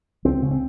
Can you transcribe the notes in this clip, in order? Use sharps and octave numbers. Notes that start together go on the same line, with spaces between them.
C#2 C4
C#3
C4